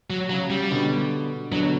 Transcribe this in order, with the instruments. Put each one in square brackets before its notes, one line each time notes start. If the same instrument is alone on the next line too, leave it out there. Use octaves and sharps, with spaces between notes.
[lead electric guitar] F#3
[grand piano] C#3 [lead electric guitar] F#3
[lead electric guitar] G3
[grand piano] B2 D3
[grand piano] B2 D3 [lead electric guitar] F#3